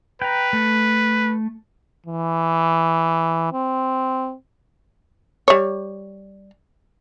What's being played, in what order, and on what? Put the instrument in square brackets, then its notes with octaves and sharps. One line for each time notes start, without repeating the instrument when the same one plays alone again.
[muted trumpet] B4 [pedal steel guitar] G5 A#5
[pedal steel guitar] A3
[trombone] E3
C4
[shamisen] G3 C#5